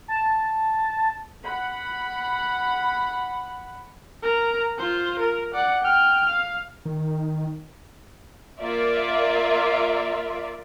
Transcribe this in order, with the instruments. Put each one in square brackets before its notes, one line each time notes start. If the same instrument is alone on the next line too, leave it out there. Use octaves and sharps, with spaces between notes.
[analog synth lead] A5
[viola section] F#5 B5
[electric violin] A#4 A#5
F4 C5
A#4
D5 F#5
G5 F6
F5
[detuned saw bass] D#3
[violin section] A#3 F4 D5 E5